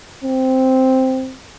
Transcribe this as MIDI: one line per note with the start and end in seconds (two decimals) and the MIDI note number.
0.24 1.34 60